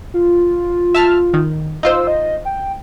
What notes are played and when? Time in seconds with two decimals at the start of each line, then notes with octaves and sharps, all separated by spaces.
0.14 F4
0.94 E5 A5 F6
1.33 D#3
1.83 D#4 F4 C5 E6
2.07 D#5
2.45 G5